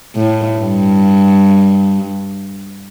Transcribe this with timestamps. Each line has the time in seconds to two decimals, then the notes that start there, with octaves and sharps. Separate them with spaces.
0.16 A2
0.58 G2